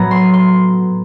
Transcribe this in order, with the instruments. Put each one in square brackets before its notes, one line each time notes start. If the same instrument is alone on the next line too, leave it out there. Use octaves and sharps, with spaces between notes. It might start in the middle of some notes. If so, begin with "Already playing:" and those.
Already playing: [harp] A2 F#3 B3 A#5
C6
C6